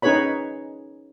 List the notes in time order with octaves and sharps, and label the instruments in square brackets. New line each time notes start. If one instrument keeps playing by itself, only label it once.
[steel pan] C#4 D#4 G#4 B4 C#5 B5